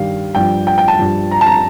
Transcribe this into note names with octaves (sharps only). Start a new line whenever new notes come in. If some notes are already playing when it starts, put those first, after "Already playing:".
Already playing: G2 D#3 G3 F5
G2 F3 G5
G5
G5
A5
G2 F3
A#5
A5
A#5